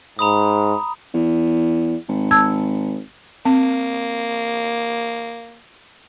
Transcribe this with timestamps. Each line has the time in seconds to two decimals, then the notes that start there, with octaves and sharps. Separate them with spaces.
0.19 G#2 A#5 B5 D#6
1.14 E2
2.09 G#1
2.31 A5 E6 G#6
3.45 A#3 C4